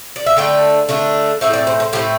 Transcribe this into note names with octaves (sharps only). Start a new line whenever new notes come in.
D5
E5
D3 A3 D4 G5
D3 A3 D4
A2 A3 C4 E5
D5
C5
C5
A2 A3 C4 G4